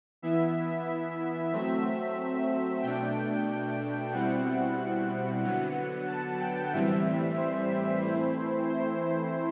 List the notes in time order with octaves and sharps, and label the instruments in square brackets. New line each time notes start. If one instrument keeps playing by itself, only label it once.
[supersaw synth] E3 B3 E4 E5
F#3 A3 C4 E5
B2 A3 D4 G5
B2 G3 C4 E4 F#5
F#5
D3 F#3 B3
A5
G5
A2 E3 G3 C4 E5
C5
E3 A3 C4 E4
C5